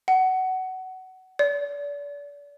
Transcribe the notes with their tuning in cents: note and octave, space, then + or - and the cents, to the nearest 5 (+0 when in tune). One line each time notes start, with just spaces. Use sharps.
F#5 +20
D5 -35